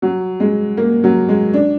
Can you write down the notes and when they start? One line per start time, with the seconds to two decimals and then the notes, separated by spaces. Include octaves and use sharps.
0.02 F#3
0.40 G#3
0.77 A#3
1.04 F#3
1.29 G#3
1.53 D4